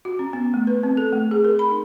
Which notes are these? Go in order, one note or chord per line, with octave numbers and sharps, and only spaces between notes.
F#4
C#4
B3
A3
B4
C4
A4
A3
G#4
A#4
B5
D#4